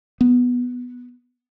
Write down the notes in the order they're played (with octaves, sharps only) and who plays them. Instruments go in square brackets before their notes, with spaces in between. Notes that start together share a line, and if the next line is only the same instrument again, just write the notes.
[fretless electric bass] B3